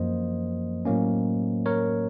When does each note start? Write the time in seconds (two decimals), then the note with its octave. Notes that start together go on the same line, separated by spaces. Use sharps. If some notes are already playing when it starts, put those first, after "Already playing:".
Already playing: F#2 F3 A#3 C5 D#5
0.85 A2 F#3 A#3 C#4
1.66 A#4 C#5